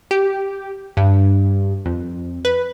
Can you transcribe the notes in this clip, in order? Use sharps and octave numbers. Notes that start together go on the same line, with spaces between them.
G4
G2
F2
B4